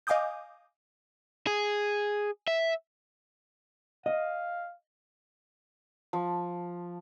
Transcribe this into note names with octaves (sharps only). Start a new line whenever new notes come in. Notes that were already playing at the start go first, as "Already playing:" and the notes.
D#5 F5 G#5 D6 D#6 G6
G#4
E5
D#5 F5
F3